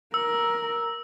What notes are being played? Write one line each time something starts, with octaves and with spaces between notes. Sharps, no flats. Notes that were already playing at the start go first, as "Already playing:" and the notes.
A#4 E6